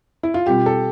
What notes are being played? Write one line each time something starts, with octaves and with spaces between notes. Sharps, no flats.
E4
F4
B2 G3 C4 F4 G4
A4